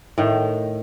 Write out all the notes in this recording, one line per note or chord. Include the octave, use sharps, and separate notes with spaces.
A2 D#3